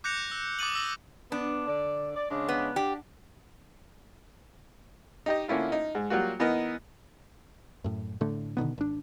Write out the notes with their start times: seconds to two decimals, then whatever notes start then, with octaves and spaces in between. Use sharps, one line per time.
0.04 D6 F#6 G6 A#6 C#7 F7
0.32 E6
0.59 D6 D#6 A6 D#7 F#7
0.75 E6 A#6 F#7
1.32 B3 D4
1.67 D3 D5
2.16 D5
2.31 C#3 G#3 D4
2.48 B3
2.76 D4 G4
5.26 D#4 G4 D#5
5.48 D3 A#3 C#4 E4 F4
5.72 D#4
5.95 G#2
6.10 F#3 G3 A#3 F4 F#4
6.40 E3 B3 D#4 A#4 D#5
7.84 F#2 A2
8.21 A2 D3 A3
8.57 B2 D3 D#3 B3
8.78 G#1 D4